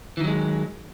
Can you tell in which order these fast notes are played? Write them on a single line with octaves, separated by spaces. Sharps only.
E3 D#3 F#3 G#3